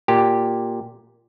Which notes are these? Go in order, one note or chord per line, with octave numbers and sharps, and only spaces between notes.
A#2 G4